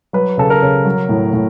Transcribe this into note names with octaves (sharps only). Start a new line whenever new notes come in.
F#3 B4
C#3 A4
A#4
C#3
F#3
A2
A2